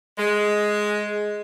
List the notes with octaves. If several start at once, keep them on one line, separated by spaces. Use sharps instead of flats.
G#3